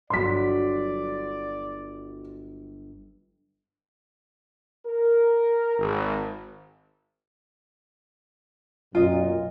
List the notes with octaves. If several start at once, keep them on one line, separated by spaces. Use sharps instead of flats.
G1 F#3 F#4 D5 C6 B6
A#4
G#1
B1 F#2 A#2 F4 D#5